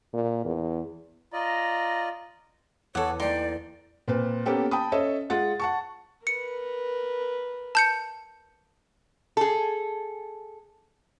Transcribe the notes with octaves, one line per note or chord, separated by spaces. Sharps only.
A#2
E2
F4 D5 D#5 A#5
E2 G#4 A4 C#5 F#5 D6
A3 A#3 D#4 A4 D5 G5 C6
A#2 C4 B4
A#3 B3 C#4 G4 A4
G5 A5 B5 D#6
C#4 A4 C#5 D#5 E5
G#3 F4 F#5 A6
F#5 A5 C#6
A#4 B4 C#7
A5 G6 C#7
G#4 A4